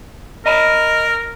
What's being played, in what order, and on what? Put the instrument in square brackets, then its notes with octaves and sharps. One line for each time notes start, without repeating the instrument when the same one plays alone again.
[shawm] A#4 [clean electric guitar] D#5 A#5 B5